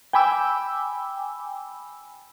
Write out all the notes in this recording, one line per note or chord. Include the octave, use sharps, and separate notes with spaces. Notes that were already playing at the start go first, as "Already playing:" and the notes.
G5 G#5 B5 D6 E6